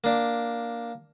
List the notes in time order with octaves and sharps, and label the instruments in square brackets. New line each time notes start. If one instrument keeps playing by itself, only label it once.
[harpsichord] A#3 D4